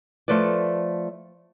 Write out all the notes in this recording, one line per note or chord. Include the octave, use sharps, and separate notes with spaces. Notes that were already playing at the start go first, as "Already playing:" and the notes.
F3 A3 A4 B4 D5